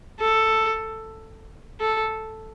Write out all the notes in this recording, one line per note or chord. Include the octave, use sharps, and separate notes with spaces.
A4
A4